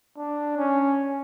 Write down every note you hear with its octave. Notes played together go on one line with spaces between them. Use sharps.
D4
C#4